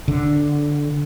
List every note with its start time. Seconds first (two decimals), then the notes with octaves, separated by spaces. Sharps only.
0.08 D3